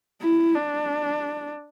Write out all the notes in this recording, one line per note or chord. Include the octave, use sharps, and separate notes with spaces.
E4
D4